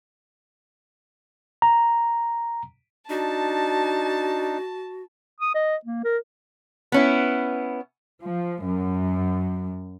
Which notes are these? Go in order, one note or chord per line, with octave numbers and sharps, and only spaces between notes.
A#5
D4 D#4 F#4 A5
D#6
D#5
A#3
A#4
B3 C#4 E4
F3
F#2